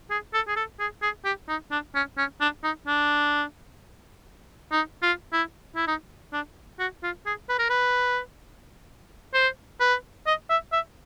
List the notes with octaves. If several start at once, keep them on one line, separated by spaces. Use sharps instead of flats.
G#4
A4
G#4
A4
G#4
G#4
G4
D#4
D4
C#4
C#4
D4
D#4
D4
D#4
F4
E4
E4
D#4
D4
F#4
F4
G#4
B4
A#4
B4
C5
B4
D#5
E5
E5